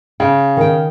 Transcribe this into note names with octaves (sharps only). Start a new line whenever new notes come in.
C#3 G5
D#3 G5